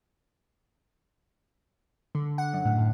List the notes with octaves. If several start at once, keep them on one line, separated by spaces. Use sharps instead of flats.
D3
F#5
F#2
A2
A2